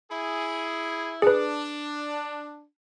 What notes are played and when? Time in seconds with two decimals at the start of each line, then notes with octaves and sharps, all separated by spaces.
0.10 E4 G#4
1.22 D4 G#4 B4